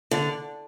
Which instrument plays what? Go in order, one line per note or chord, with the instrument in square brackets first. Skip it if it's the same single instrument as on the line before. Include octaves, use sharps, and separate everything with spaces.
[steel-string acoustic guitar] D3